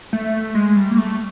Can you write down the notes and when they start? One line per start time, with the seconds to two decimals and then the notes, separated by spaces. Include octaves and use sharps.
0.13 A3
0.55 G#3
0.76 G3
0.91 A#3
0.98 A3